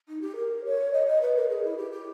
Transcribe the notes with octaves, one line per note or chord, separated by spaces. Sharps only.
D#4
G4
A#4
C#5
D#5
D#5
B4
A#4
G#4
E4
G4
G4